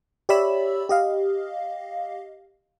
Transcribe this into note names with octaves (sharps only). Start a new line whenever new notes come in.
G4 C#5 D5 E5 B5 E6
G4 D#5 F5